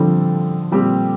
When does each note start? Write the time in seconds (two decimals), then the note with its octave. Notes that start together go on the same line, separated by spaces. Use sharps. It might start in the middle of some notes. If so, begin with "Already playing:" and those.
Already playing: D3 F3 G3 C4 F4 A4
0.72 A#2 G3 C4 G4